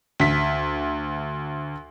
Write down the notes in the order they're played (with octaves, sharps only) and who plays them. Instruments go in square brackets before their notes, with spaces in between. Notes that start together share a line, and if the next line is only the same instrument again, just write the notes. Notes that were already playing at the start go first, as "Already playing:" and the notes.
[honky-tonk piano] D2 B6